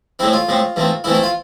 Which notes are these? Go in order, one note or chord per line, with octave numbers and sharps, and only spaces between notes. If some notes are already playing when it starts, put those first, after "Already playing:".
A2 G#3 C4 E4
F4
A2 G#3 C4
G#2 E3 A3 C4
G#2 E3 A3 C4 E4
E4
F4